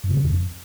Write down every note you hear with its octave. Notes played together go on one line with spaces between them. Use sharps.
G2
C3
C#3
E2
F2